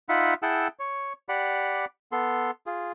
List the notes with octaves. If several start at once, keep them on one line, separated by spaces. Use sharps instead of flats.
D#4 F4 E5 F#5 B5
E4 G#4 F#5 G5 A5 E6
C#5
G4 D5 F#5 B5
B3 A4 C6
F4 G#4